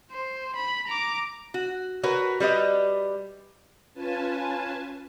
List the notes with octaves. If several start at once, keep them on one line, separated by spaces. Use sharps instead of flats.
C5
B5
A#5 D6
F#4
F#4 A#4 B4 C#5
G3 B4 C5 D#5
C#4 F4 B4 G#5 A5